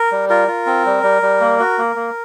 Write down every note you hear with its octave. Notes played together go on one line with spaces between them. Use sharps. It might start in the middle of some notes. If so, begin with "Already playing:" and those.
Already playing: A#4
G3
F4 A#4
F4
C4
G3
G3
G3
A#3
F#4
A#3
A#3